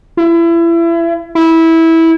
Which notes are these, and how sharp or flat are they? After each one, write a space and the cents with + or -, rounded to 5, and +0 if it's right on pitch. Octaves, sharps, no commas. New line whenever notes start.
E4 +30
E4 -15